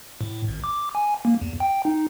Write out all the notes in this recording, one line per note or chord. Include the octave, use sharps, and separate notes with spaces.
A2
G#1
D6
G#5
A#3
E2
G5
D#4